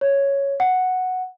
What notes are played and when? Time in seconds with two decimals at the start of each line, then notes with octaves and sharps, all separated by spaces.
0.01 C#5
0.60 F#5